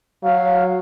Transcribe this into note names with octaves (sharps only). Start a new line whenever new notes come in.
F#3 F5